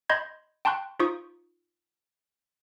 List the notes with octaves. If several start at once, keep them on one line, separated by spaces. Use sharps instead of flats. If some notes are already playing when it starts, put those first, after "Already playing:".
D#5 B5 C6 G6 G#6
G5 A5 C6 C#6 F#6
D#4 F4 C5 C#6 D#6